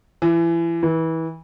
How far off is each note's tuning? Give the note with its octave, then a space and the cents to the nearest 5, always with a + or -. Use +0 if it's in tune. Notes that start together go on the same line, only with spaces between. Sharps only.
E3 +30
E3 -25